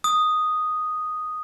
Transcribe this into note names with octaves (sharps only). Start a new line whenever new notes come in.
D#6